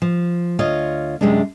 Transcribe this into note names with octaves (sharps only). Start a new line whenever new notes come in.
F3
D2 F4 C#5 D#5
F#2 C3 G#3 C#4 D4